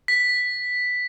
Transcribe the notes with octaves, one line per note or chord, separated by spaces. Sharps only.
B6